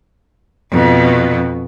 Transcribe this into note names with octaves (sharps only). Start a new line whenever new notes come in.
F2 B2